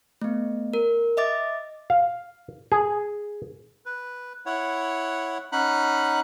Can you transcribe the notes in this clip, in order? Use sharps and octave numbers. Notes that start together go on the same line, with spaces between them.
A3 B3
A#4
D#5 E5 D6 A6
F5
G#4
B4
E4 C#5 F#5
C#4 D#4 F#5 B5 F#6